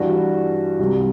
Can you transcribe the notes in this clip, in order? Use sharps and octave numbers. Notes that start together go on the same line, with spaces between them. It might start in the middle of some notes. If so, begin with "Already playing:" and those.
Already playing: G2 E3 G3 D4 F#4
C2 C3 G3